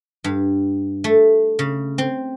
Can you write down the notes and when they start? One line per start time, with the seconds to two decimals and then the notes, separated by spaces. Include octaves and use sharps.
0.24 G2
1.04 A3
1.59 C#3
1.98 C4